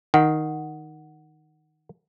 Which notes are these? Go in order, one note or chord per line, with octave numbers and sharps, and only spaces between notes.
D#3 F#5